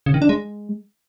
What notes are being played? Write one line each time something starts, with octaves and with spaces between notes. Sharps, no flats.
C#3
D#3
D4
G#3